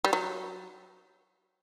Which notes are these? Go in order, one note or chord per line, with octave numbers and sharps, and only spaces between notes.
G3
F#3